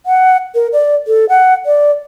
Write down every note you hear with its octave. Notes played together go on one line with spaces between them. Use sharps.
F#5
A#4
D5
A4
F#5
D5